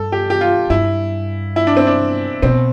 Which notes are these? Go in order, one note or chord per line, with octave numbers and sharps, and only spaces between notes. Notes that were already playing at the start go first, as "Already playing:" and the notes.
Already playing: G2 A4
G4
G4
F4
G2 E4
E4
D4
C4
D4
B2 C4